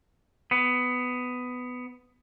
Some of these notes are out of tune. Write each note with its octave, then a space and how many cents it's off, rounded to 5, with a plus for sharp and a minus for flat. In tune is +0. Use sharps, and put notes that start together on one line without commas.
B3 +15